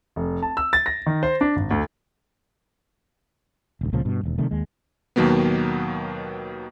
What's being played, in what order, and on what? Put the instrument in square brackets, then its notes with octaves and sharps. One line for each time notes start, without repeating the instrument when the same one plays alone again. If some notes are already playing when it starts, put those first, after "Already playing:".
[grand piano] F1
A5
E6
A6
A#6
D#3
C5
D4
G#1
D2
[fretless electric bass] D#1 D2
C#2 A#2 C#3 F3
G2 B2
E1 D#2
C3 D#3 G3 A3
D#2 G#3
[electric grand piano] D#2 B2 D#3 F#3 A#3 B3